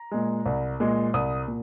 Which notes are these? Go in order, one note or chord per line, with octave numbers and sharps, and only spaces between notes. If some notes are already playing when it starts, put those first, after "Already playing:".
Already playing: A#5
A#2 G#3
C2
A#2 G#3
C2 D#6
A#2